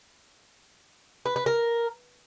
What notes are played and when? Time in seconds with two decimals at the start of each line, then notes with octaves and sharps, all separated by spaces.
1.26 B4
1.36 B4
1.46 A#4